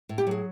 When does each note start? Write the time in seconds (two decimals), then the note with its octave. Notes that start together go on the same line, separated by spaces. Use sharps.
0.09 A2
0.18 G4
0.27 F#3 G#4